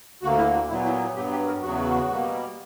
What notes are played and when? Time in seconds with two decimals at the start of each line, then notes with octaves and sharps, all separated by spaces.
0.23 D2 D3 A#3 F#4
0.38 E4
0.54 F#4
0.69 A#2 F#3 B3 E4
0.85 E4
1.15 G2 F#3 B3 G4
1.31 G4
1.47 A#4
1.62 E2 C#3 F#3 B3 F#4
2.08 B2 G3 A#3